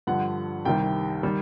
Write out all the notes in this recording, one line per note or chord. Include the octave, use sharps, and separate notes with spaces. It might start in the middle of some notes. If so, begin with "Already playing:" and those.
G2 D3 F3 F#5
C2 C3 D#3 G3 G5
D#3 G3